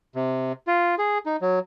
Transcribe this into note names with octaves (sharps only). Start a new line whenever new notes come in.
C3
F4
G#4
D#4
F#3